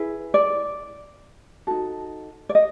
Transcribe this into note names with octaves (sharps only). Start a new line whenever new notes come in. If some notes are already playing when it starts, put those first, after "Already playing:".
Already playing: E4 G#4 B4
D5
D#4 F#4 A4
D5
D#5